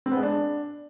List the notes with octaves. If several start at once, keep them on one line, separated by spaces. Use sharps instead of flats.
C4
B3
G#3
D4